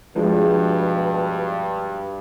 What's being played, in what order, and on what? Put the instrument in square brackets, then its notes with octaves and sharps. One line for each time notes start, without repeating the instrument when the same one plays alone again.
[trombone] G2 [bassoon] B2 [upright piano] F3 G#3 D4